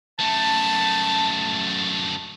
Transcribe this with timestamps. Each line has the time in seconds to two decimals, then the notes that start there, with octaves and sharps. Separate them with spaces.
0.20 F#2 A3 A5